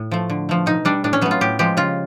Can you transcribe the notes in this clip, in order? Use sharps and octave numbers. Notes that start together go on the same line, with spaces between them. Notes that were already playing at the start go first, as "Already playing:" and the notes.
Already playing: A2
F3 A3
D3
F3 A3
B2 D#4
G3 D4
A2 D4
C#4
F#3 A3 B3
F4
A2 G4
F3 G#3 G4
C#3 F4